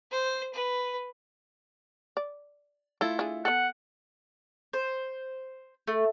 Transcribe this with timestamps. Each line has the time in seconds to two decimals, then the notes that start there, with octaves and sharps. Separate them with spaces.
0.11 C5
0.53 B4
2.17 D5
3.01 A3 E4 F4 A4
3.19 D4 G#4
3.45 B3 A4 F#5
4.73 C5
5.87 A3